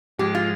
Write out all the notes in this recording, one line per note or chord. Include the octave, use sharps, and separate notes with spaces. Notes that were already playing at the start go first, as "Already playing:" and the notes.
G#2 F3 G#3 G4
F4